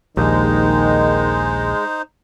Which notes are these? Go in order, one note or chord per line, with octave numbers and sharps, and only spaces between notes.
A#1 D#2 D#3 G#3 D#4 C5